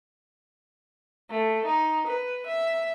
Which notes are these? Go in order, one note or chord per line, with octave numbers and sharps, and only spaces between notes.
A3
D#4
B4
E5